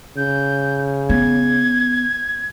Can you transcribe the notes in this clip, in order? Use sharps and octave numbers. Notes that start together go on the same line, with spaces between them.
C#3 G6
B3 G#6